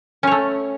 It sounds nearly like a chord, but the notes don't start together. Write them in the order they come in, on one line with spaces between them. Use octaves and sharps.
C#4 C#5 A3